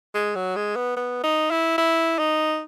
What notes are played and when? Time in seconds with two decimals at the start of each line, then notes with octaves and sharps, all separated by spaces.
0.15 G#3
0.35 F#3
0.56 G#3
0.76 B3
0.96 B3
1.23 D#4
1.51 E4
1.78 E4
2.19 D#4